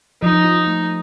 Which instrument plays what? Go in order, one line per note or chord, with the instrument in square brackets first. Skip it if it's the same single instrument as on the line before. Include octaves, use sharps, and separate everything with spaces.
[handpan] F3 [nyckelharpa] D#4
[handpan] F4
A3